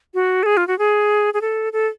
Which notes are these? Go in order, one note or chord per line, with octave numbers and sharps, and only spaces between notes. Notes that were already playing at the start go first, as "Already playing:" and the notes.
F#4
A4
G#4
F4
F#4
G#4
G#4
A4
A4